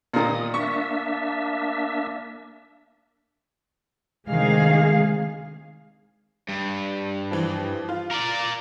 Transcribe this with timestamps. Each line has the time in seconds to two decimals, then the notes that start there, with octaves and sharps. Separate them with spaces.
0.14 A#2 D#3 D#6
0.54 A#3 D4 E5 C#6
4.29 D2 C3 D#3 G#3 G#4 F5
6.49 G2
7.31 E3 F3
7.89 F4
8.11 A#4 D5